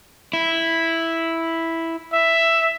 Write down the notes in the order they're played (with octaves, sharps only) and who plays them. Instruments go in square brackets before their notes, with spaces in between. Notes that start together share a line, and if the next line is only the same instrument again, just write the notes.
[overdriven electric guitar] E4
[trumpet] E5